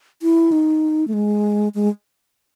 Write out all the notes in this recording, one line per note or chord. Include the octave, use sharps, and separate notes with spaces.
E4
D#4
A3
G#3
G#3